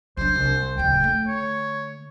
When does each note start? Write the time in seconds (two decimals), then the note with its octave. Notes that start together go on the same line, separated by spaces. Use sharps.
0.17 B1 D4 C5
0.36 C2
0.77 D1 C#2 G5
1.00 D3 A3
1.27 C#5